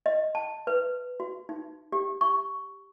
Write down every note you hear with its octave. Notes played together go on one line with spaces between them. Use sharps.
D#5
A5
B4
F#4
D#4
G4
C#6